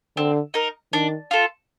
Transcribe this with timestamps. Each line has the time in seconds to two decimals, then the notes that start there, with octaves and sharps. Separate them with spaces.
0.17 D3 C4
0.54 D#4 A#4
0.93 D#3 D4
1.31 F4 A4